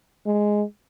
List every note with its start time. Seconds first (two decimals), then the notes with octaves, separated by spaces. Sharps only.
0.26 G#3